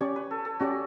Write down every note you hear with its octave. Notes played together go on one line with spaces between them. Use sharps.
C#4 G4 C#5 D5
B4
A4
A4
C#4 F#4 G4 D5